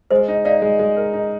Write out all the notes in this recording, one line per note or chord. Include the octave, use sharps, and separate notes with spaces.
G#3 C5 D#5
D#4
D#4 D5 F5
G#3
G#3
A#4
D#4